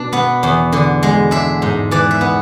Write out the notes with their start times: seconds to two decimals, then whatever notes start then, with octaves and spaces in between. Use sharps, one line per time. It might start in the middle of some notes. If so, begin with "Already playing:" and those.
Already playing: B2 D4
0.13 B3
0.43 E2
0.73 D3
1.03 G#3
1.31 D4 E5
1.62 G#2
1.91 E3 D5
2.11 E5
2.21 B3